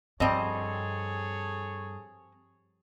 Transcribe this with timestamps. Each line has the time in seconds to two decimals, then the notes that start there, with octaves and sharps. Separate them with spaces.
0.20 G2 F3 G3 C4 G#4 A4 C#5 D#5